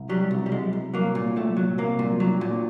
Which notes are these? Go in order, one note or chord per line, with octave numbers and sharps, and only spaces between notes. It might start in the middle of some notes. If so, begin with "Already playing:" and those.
Already playing: C2
F#3 G3
C2
G3
C2 G#3
C2
F#3 A#3
A#2
C2 A3
F#3
C2 A#3
A#2
F#3
A#2